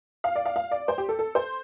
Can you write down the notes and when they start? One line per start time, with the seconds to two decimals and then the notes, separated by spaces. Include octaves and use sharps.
0.24 F5
0.35 D5
0.45 F5
0.56 F5
0.71 D5
0.88 C5
0.98 G4
1.09 A4
1.19 A4
1.35 C5